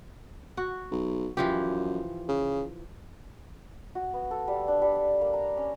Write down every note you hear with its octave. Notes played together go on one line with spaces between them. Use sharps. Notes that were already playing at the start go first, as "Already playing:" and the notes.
F#4
B1
F#2 E3 F3 G4
C#3
F#4
B3
A4
G3
D4
G3
D4
A#3
A#5
C#4